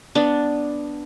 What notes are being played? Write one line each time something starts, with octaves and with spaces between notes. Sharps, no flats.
B3 D4